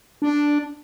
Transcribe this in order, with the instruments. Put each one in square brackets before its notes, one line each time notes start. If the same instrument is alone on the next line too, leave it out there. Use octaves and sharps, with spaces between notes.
[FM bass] D4